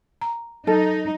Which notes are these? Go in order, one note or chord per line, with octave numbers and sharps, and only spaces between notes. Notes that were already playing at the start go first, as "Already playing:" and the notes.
A#5
F#3 D#4 A4